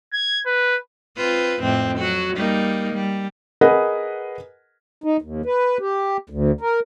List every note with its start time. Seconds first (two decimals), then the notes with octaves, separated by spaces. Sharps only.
0.13 G#6
0.46 B4
1.17 C4 F4 B4
1.62 F2 A2 C4
1.98 F#3 F#4
2.36 G3 A#3 D#4
2.93 G3
3.61 G#4 A#4 B4 D#5 F#5
5.04 D#4
5.22 D#2
5.46 B4
5.80 G4
6.30 D2
6.61 A#4